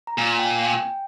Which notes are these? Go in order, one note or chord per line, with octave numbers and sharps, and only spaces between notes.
A#5
A#2 G#5
G5
G#5
G5